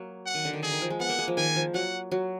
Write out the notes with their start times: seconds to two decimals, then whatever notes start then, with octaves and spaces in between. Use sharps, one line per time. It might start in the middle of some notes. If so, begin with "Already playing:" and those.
Already playing: F#3 A#3
0.26 F#5
0.35 D#3
0.45 D3
0.53 D#3
0.63 D3 G#4
0.72 D#3
0.82 F3
0.90 G#3
1.00 B3 F#5
1.09 A#3
1.18 G#3
1.28 F3
1.37 D#3 G#5
1.56 F3
1.74 F#3 F#5
2.11 F#3